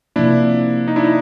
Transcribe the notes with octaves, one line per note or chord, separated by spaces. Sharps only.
C3 F3 A#3 D4 E4
D#4
D4 E4
D#4